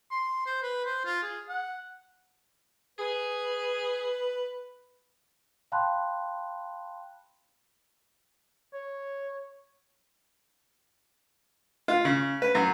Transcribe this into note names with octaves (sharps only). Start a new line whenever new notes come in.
C6
C5
B4
C5
F4
G#4
F#5
G#4 B4
F5 G5 A5 B5 C6 F#6
C#5
F4
C#3
B4
F#2